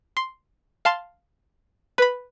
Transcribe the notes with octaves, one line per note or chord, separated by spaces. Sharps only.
C6
F5 A5 C6
B4 B5